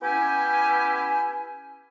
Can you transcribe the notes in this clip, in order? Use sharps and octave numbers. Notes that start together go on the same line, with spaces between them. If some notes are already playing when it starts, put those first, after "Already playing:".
B3 C#4 E4 G4 G#5